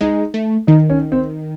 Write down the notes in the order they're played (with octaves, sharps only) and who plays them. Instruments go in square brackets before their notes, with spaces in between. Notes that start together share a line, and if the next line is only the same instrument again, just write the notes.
[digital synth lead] G#3 [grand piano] D#4
[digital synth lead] A3
[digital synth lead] D#3 [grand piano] D#4
[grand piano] C#4
C4